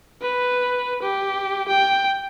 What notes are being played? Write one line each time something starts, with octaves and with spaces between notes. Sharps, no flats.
B4
G4
G5